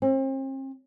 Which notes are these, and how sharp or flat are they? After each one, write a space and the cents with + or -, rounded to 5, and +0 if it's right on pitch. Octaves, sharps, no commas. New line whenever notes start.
C4 +40